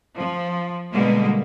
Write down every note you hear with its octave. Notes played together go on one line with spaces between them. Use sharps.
F3
B2 D3 G3 G#3 A#3